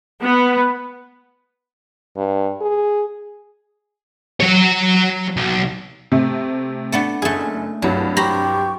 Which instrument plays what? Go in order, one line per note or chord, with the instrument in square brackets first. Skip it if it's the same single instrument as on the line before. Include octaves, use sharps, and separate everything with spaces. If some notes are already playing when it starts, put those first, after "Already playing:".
[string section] B3
[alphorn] G2
G#4
[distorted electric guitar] F#3 C#5
B1
[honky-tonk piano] C3 A3 C4
[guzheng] A3 B3 D4
[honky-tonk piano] F#1 [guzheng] A3 G#4
[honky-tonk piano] C2 G2 [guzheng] F#3
[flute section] G4 C#6 [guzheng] C5 A#5 B5